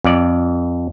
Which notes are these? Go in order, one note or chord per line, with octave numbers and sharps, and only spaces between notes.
F2 D5